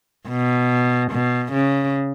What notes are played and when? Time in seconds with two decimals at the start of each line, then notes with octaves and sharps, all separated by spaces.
0.28 B2
1.11 B2
1.52 C#3